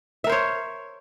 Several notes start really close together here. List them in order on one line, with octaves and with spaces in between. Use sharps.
E5 A#4 C5 C#5